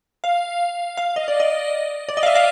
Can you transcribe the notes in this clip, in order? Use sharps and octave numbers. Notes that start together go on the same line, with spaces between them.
F5
F5
D#5
D5
D#5
D5
D#5
F5
E5
F5